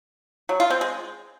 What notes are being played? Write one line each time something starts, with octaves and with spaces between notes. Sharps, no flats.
F#3
F4
C4
G#3